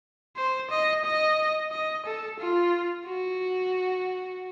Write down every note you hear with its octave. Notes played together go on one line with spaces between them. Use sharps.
C5
D#5
D#5
D#5
A4
F4
F#4